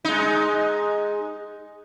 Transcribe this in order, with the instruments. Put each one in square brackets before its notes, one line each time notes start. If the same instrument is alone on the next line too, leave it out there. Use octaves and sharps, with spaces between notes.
[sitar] G#3 D#4